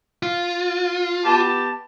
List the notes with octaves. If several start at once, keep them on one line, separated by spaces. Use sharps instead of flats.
F4
B3 G4 A5